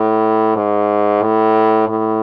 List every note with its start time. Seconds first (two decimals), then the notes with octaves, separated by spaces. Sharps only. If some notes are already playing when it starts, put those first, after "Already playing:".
Already playing: A2
0.56 G#2
1.23 A2
1.88 A2